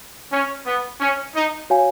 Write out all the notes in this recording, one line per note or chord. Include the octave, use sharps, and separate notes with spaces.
C#4
B3
C#4
D#4
F#4 C#5 F5 G#5